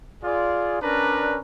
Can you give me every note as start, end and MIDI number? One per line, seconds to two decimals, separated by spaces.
0.24 0.78 65
0.24 0.78 68
0.24 0.78 74
0.82 1.38 61
0.82 1.38 62
0.82 1.38 70
0.82 1.38 71
0.82 1.38 74
0.82 1.38 82